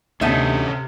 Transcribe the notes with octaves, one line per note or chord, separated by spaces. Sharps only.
D2 C3 B3 C#4 D#4 A4 E5